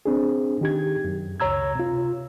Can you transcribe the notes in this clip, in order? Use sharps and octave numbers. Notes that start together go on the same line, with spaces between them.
C4 D4 G#4
D#3 G4 G#6
F#2
C#2 C#5 A#5 E6 G#6
C3 F4